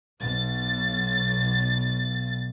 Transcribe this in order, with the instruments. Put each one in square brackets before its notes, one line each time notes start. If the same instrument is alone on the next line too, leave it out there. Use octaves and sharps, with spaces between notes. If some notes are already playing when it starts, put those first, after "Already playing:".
[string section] B1 A6